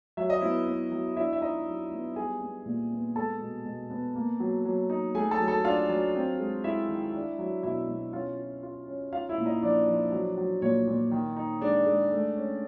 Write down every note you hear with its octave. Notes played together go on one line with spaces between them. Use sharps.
F#3 E5
D#5
B3 E4 E5
B3
F#3
D4 E4 E5
E5
D#4 F4 D#5
F#3
B3
G3 G#4 G#5
B3
A#2
B3
G#3 A4 A5
B2
B2
B3
A#3
F#3
F#3
D#4
A3 G#4 G#5
A4 A5
F#3
A4 A5
D4 F4 F5
F#3
C4
G#3
G#3 E4 E5
D#3
D4
F#3
B2 E4 E5
B2
C#4 F4 F5
F4
F4
C#4
D#4 F4 F5
E4 E5
A#2
D#4 D#5
F3 D4 D5
F3
F#3
F#3
A#2 C#5
A#2
D#3
D#4
G#3 D4 D5
G#3
A3
C#4